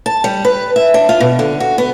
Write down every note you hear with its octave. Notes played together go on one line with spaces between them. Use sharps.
A5
G3
B4
E5
D4
F4
B2
D3
F#4
B3